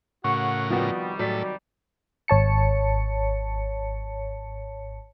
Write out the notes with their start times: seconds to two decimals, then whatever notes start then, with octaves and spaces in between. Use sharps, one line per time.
0.24 A2 C#3 F#4 A#4 F#5 C#6
0.70 C3 D#3 F3 G3 B3 F#4
1.19 A2 F#3 A4 D5 B6
2.28 G#1 C#5 A5 C#7